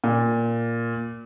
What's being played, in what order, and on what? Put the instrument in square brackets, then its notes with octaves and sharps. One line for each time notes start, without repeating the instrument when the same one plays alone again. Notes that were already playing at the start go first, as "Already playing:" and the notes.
[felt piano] A#2